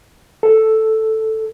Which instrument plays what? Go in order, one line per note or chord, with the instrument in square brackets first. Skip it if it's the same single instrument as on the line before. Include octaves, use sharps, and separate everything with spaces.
[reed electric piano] A4